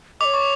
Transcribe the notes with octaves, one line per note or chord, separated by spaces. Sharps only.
C#5 D#5 D6
C#6